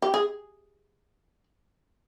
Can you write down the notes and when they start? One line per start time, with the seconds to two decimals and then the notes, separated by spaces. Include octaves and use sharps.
0.02 G4
0.14 G#4